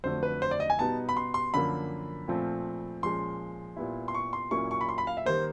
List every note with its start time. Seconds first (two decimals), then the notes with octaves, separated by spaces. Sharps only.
0.04 F2 D3 F#3 A3 C5
0.23 B4
0.42 C5
0.51 D5
0.60 D#5
0.70 G#5
0.79 B2 G3 B3 D#4 A5
1.09 B5
1.17 C6
1.34 C6
1.54 F#2 D3 F3 A#3 B5
2.28 A#2 F3 A3 C4
3.03 A#2 F3 G#3 C#4 C6
3.77 A#2 G3 B3 E4
4.08 C6
4.15 C#6
4.33 C6
4.51 A#2 F#3 A#3 C#4 E4 C#6
4.71 C#6
4.81 B5
4.89 C6
4.98 B5
5.07 F5
5.17 E5
5.26 D#3 G3 A#3 C5